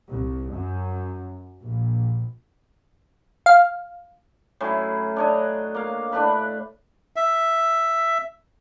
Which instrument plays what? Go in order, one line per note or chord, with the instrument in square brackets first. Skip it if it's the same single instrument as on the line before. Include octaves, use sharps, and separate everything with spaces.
[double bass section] C2
F#2
A#1
[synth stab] F5
[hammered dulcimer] A2 F#3 C#4 E4
D4 C#5 D#5
A#3 F5
A2 D4 B4 B5
[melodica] E5